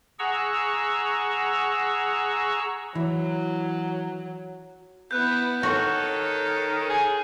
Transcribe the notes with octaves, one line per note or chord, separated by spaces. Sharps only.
G#4 F#5 A#5 C#6 E6
E3 F#3
B3 E4 F#6 G6
D#3 F#4 A4 C#5
G#4